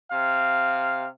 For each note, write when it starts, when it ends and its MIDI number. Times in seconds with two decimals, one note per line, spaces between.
0.11 1.08 48
0.11 1.08 77